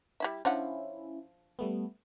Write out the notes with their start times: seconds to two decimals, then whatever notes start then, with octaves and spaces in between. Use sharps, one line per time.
0.20 G3 E4 E5
0.45 F3 C#4 D4 E4 F#5
1.59 G3 A3 B3